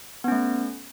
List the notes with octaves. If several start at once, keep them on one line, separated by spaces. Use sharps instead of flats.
A3 B3 C#4